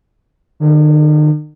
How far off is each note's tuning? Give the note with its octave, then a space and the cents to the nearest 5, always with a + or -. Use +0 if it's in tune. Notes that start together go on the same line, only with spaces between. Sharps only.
D#3 -45